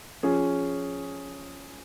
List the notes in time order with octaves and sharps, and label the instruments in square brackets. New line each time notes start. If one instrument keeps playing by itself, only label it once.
[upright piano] F3 C#4 G#4